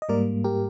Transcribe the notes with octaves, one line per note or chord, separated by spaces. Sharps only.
D#5
G#2 G3 A#3 A#4 D5
G4 A#4